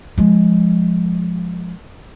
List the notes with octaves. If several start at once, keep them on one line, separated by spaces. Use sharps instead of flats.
F3 G#3